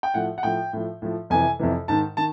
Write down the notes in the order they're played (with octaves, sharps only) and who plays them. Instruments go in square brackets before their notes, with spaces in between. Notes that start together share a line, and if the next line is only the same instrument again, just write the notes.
[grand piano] G5
A2 F3 F#5
F#5
A2 F3 G5
A2 F3
A2 F3
F2 C3 E3 G#5
F2 C3 E3
G#2 D#3 A5
D#3 A5